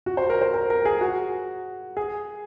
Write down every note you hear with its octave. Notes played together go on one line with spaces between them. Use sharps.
F#4
C5
A#4
C5
A#4
A#4
G#4
F#4
G#4